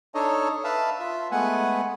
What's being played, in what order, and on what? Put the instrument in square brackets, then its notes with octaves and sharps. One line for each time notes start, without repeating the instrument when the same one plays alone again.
[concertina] D4 D#4 A4 C#5 D#5
B4 E5 F5 A5
F4 E5
G#3 A3 B3 B4 F#5 G#5